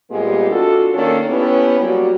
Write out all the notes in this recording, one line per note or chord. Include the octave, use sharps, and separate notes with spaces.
A#2 G3 G#3 B3 C4 G4
D4 F4 F#4 A4
D#3 A#3 C#4 D4 A4
B3 C#4 E4 G4 A4 B4
F#3 G3 A#3 F#4